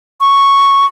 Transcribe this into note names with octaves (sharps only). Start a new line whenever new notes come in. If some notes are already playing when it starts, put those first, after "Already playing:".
C#6